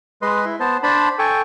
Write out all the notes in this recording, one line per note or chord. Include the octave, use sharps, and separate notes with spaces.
G#3 B4 D#5 C6
E4
B3 C5 A5
D4 C5 A5 B5
A4 G5 G#5 C#6